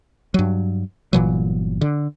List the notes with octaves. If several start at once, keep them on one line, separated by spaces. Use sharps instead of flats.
G2 F#3
G1 A#2 E3 F#3
D3